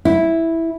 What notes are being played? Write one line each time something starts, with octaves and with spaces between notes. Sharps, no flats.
E4